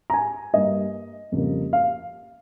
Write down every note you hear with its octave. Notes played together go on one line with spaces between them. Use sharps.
A#5
G#5
G2 G3 A#3 D#5
F2 C#3 G3 A#3
F5